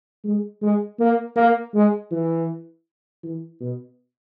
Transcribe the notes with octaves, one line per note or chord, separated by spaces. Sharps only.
G#3
G#3
A#3
A#3
G#3
E3
E3
B2